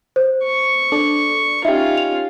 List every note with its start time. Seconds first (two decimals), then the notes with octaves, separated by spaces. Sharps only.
0.16 C5
0.44 C#6
0.92 D4 A4 D5
1.65 C#4 D#4 F4 G4 E5
1.98 F7